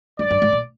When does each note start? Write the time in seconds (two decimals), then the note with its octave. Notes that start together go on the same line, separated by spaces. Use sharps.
0.19 G2 D5
0.30 G2
0.42 G#2
0.52 A#2